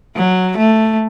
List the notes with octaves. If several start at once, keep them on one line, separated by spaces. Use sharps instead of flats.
F#3
A3